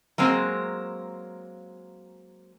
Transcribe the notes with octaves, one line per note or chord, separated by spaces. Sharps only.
F#3 G#3 A#3 C4